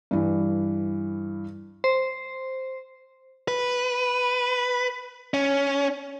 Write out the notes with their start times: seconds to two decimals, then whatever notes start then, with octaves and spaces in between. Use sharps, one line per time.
0.11 G2 E3
1.84 C5
3.48 B4
5.34 C#4